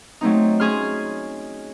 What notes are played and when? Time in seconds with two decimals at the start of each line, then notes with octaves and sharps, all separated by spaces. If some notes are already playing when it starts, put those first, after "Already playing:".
0.21 F#3 A3 C4 D#4
0.60 C#4 G#4 C6 F6